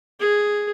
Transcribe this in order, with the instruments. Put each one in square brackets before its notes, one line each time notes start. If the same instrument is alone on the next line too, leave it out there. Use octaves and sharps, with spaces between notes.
[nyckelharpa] G#4